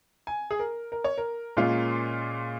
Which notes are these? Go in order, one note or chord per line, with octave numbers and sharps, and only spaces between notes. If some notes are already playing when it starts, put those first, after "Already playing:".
G#5
G#4
A#4
A#4
C#5
A#4
A#2 G#3 C#4 F4